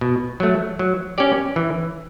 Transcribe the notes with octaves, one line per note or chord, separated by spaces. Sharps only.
B2
F#3 A3
F#3
C#4 G4 D5
E3